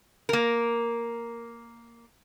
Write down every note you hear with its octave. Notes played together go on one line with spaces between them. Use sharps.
A#3 A#4